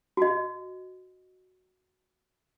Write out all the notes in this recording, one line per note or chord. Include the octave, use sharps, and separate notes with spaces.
F#4 D#5